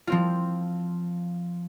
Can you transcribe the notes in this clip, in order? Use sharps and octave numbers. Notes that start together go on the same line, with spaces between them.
F3 C4 F4